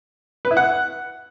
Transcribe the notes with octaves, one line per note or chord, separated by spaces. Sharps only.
B4
E4
F#5